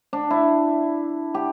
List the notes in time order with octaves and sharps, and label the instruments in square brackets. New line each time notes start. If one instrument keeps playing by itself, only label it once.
[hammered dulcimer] D4
E4
G4